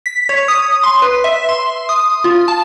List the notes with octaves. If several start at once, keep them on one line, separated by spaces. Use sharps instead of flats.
B6
C#5
D#6
C6
B4
E5
C6
D#6
F4
A5